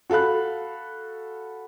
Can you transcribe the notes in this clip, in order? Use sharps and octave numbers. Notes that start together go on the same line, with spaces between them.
F#4 A4 F5 B5 F#6